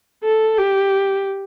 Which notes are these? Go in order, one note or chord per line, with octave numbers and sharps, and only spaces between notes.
A4
G4